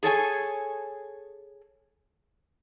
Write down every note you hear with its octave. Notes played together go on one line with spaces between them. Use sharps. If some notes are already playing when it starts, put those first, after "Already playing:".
G#4 A4 C#5 G#5